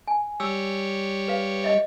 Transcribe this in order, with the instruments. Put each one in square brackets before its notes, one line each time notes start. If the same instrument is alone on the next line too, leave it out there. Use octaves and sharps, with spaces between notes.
[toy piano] G#5
[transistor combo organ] G3 C#5 [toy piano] E6
[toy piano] B4 F5
D#5 E5